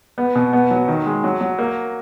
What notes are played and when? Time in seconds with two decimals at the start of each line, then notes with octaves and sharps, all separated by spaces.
0.18 B3
0.35 B2
0.53 B3
0.71 F#3
0.88 D#3
1.06 G#3
1.24 F#3
1.41 F#3
1.59 A#3